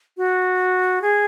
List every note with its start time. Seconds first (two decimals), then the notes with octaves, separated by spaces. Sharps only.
0.17 F#4
1.02 G#4